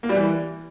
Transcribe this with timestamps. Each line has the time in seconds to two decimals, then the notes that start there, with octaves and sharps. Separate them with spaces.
0.03 A#3
0.09 G3
0.15 E3